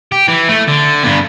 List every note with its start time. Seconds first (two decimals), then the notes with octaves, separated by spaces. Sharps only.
0.12 G4
0.28 E3
0.49 A3
0.68 D3
1.04 G2 B3